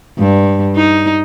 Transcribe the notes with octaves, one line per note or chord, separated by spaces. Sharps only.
G2
D#4